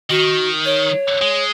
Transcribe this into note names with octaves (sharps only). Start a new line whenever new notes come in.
D#3 F#4
C#5
G#3